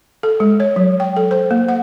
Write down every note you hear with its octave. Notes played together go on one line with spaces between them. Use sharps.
A4
G#3
C#5
F#3
G5
A4
C5
A#3
F#5